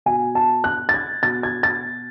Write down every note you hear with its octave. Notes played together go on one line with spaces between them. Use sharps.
B2 G#5
A5
F#6
A6
G#6
B2 A6
G#6
A6